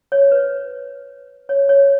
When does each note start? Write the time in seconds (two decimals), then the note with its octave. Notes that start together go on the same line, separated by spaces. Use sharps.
0.12 C#5
0.32 B4
1.49 C#5
1.69 C#5